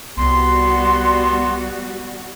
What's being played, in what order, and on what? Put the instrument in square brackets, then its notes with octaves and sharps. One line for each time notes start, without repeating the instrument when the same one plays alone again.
[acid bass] C2 [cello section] G3 F#4 [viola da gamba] B3 [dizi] C6